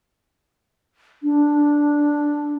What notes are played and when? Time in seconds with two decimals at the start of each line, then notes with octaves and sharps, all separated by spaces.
1.23 D4